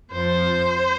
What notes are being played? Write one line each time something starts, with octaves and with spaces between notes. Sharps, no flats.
F2 F3 C5